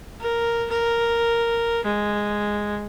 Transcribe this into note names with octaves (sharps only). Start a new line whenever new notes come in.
A#4
A#4
G#3